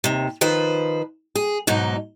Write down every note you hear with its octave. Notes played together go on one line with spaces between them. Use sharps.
D#2 C3
D#3 F3 B4 C5
G#4
G#2 B2 F#3 D#4